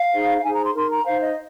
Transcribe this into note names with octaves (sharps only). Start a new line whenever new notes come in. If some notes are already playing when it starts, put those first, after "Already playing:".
Already playing: F5
D#4 G#4 C5
F5
D#4 G#4 C5 G#5
A#5
C6
D#4 A#4 C6
A#5
D#4 C5 F5
D#5